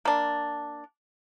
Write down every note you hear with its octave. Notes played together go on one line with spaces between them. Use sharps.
A#3 D4